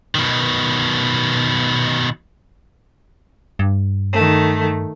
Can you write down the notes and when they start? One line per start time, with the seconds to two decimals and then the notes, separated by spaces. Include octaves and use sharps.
0.15 B2 D#3
3.59 G2
4.12 D#3 A3